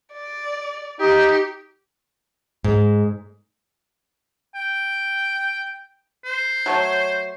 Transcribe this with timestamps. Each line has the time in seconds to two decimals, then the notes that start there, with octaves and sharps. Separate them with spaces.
0.13 D5
1.00 D#4 G4
2.64 G#2
4.55 G5
6.25 C5
6.66 F#3 A3 C#5